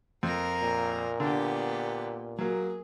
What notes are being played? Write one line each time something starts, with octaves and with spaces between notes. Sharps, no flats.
F2 A#3 A#4
A#2
D3 B3 G4
F#3 A#3 G#4